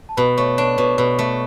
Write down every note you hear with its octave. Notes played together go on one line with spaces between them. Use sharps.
A5
B2 B4 B5
A3 C#5 C#6
D4 C#5 C#6
B2 C#5 C#6
B2 B4 B5
A3